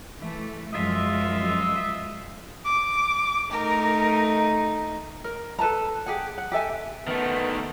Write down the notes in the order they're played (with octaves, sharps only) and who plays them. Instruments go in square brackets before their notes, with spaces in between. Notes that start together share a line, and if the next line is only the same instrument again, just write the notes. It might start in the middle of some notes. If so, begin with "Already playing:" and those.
[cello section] E3 A3
[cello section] F#2 F3 G#3 [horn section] F4 D#5 E5
[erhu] D6
[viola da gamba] A3 D#4 [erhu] A#4
[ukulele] A#4
A4 B4 A5 A#5
G4 G#4 F#5
F#5
G4 A4 E5 G#5
[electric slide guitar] D#3 A3 [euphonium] B3